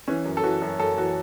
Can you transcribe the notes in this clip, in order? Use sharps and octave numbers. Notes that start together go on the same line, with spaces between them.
E3 C#4
F#2
A4
E3 F#4
F#2
F#2 A4
E3 F#4